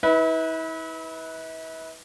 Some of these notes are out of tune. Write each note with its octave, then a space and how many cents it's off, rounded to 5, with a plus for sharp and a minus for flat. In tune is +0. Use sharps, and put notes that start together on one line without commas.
E4 -40 B4 -5